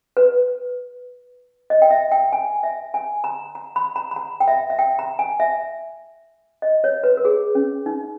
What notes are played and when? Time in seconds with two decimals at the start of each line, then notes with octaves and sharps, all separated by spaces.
0.17 B4
1.70 D#5
1.82 G5
1.91 E5
2.12 G5
2.33 G#5
2.63 E5
2.94 G#5
3.24 A#5
3.55 A#5
3.76 B5
3.96 A#5
4.11 B5
4.16 A#5
4.40 G5
4.48 E5
4.70 E5
4.79 G5
4.99 A#5
5.19 G#5
5.40 E5
6.62 D#5
6.84 C#5
7.04 B4
7.17 A#4
7.25 G#4
7.55 C#4
7.86 D#4